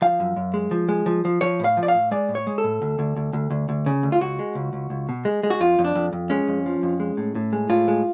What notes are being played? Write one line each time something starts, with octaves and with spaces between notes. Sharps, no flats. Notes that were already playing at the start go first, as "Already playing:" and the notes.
F3 F5
F#2
F#2
G#3
F3
G#3
F3
F3
F3 C#5
A2 F5
F3
D5
F5
A2
G#3 D5
A2
C#5
G#3
A4
A2
D2
D2
D2
D2
D2
D2
C#3
D2
F4
C#2 F#4
G#3
C#2
C#2
C#2
B2
G#3
G#3
F#4
F2 F4
F2
D4
F2
F2
G#3 C#4
F2
F3
F2
G#3
A2
A2
G#3
A2 F4
G#3